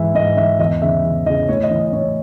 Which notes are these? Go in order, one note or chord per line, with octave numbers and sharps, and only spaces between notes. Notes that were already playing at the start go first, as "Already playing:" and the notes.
Already playing: G#2 E3 E5
G#2 D#5
E3 E5
E2 D#5
C#3 E3 E5
E2
C#3 E3 D#5
A2 C#5
D#5
E3
D#5
A2 C#5